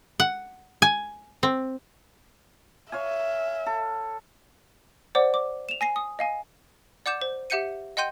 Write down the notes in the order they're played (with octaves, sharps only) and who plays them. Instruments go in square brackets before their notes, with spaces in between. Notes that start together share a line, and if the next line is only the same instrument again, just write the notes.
[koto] F#5
G#5
C4
[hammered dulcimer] C#5 F5 G#5 [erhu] E5
[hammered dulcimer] A4
[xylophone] C5 D5 F#5 D6
D6
E7 F7
G#5 A#6 C7
D#6
D#5 F5 G#5
D5 F#5 D6 G6 E7
C5
G4 E5 F#5 G6 C#7 D#7
D#5 F#5 G5 C6 G6 D#7